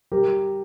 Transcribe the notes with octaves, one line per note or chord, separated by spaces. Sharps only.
G3 G4 A#4